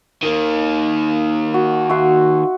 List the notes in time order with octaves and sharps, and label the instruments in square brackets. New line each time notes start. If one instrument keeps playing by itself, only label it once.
[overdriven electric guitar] D#3 A#3
[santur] F#4
F#4 E5 C6